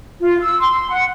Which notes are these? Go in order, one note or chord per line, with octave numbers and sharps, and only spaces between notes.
F4
E6
C6
F#5